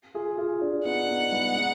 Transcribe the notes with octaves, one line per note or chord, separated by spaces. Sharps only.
F4 G#4
F4 G#4
D4 F4
B3 D#4 F#5
B3 D#4
G#3 B3
B3 D#4